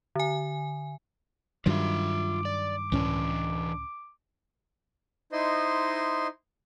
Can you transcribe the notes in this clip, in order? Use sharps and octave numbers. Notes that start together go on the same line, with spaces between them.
D3 G#5
G2 D#3 F#3 F4 E5 D6
D5
C#2 A2 E3 C#4 D4
D#4 E4 C5 D#5 C6